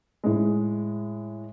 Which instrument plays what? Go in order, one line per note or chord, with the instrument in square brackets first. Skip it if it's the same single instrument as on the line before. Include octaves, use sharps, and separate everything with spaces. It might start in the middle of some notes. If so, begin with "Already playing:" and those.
[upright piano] A2 G#3